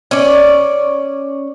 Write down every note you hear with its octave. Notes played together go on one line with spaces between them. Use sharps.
C#4 D5